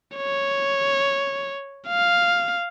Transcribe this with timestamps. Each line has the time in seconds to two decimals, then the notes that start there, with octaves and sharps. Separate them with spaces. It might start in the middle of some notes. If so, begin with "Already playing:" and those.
0.16 C#5
1.88 F5